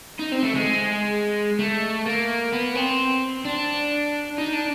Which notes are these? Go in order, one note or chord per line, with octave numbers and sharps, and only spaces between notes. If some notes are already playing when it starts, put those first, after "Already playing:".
D#4
C4
A3
G#3
A3
A#3
B3
C4
D4
D#4
D4